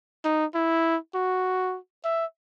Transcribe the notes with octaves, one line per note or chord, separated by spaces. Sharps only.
D#4
E4
F#4
E5